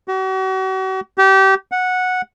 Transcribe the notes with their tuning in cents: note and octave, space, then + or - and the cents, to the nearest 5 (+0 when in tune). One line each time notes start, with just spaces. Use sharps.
F#4 +40
G4 -25
F#5 -10